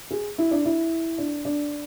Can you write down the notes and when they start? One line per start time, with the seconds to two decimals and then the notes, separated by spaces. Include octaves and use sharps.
0.11 G#4
0.38 E4
0.51 D4
0.65 E4
1.18 D4
1.45 D4